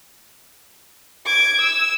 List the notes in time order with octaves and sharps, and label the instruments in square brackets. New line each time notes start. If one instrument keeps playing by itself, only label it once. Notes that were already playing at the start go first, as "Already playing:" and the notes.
[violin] D6 G#6
E6